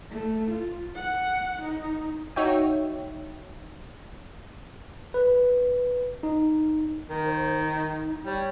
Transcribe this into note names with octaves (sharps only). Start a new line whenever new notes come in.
A3
F4
F#5
D#4
D#4 F#4 C#5 E5 G5
B4
D#4
D#3 A#4
C5
D#4
G3 C#5